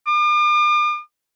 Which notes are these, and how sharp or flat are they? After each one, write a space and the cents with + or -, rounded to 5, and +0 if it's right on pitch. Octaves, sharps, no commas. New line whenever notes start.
D6 +45